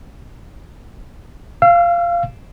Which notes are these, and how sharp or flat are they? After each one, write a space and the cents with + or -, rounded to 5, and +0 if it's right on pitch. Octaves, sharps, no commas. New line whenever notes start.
F5 -15 E6 +35